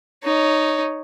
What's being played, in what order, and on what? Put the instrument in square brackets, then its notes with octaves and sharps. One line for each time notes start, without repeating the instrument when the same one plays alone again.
[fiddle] D#4 C#5